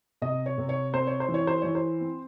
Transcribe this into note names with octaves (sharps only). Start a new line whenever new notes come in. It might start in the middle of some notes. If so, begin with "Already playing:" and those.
C3 D#5
C#5
C3
C#5
C4 C5
C#5
C5
E3
C#5
C5
E3 C#5
C5
C4